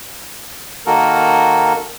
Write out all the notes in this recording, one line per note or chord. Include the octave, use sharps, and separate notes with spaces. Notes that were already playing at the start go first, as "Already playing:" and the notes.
D#3 A#3 F#4 A4 A#4